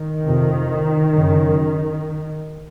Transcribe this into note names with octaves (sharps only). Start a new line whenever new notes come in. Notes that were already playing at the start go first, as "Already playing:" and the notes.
Already playing: D#3
F2 C3
F#2 C#3